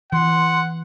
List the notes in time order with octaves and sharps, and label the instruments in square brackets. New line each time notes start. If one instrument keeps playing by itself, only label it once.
[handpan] E3 [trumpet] F#5 [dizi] C6